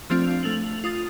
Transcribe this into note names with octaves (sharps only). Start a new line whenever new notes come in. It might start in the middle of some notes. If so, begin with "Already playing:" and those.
F3 A3 C4 D4 F4
A3 F7 F#7
F4 D#6 A6